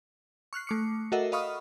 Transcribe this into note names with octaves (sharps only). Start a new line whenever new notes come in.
C#6 F6 F#6 C7
A3 D6 C#7
F#4 A4 A#4 D#5 E5 F#5
D#5 F5 B5 C#6 D#6 F6